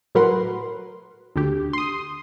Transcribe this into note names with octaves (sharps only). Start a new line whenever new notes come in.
A2 F#3 A#4 B4 F#5 C6
D2 D3 G4
C6 D#6